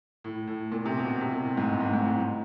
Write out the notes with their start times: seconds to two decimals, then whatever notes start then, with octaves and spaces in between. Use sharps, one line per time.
0.24 A2
0.48 A2
0.72 A#2
0.86 C3
0.97 B2
1.21 C3
1.32 A#2
1.45 A2
1.57 G#2
1.69 G2
1.81 G#2
1.93 G#2
2.05 A2